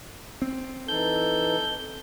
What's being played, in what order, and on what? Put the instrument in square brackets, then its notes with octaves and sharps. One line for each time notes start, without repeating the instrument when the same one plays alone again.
[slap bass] C4
[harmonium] E3 D#4 [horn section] A4 [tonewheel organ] G6